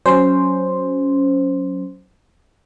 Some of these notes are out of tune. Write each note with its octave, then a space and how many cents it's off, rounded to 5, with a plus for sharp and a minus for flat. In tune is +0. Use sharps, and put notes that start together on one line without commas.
F#3 +0 C#4 +0 C5 +0